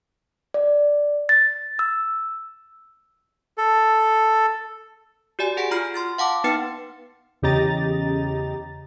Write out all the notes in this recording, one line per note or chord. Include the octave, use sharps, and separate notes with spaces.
D5
A6
E6
A4
F#4 G4 D5 G#5
G#4 F#5 G#5 B6 D7
F4 A#5 B5 F6 C7
C6 F6 A6
F5 F#5 A5 D6
B3 D#4 B4 G5 F6 C#7
E2 C#3 G4 D#5 A#5 A6